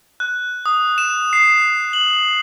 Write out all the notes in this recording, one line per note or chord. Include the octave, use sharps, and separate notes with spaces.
F#6
D#6
E7
C7
F#7